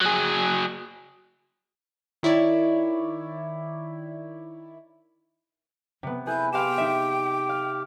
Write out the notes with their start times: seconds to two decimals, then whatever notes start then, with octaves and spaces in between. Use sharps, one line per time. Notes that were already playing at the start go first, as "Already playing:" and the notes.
0.01 F#3 G#4
2.23 D#3 E4 C#5 D5
6.03 C3 B3
6.27 E4 G#4 B4 G6
6.52 G4 F5 G5 C6 E7
6.78 D#4 E5
7.49 F5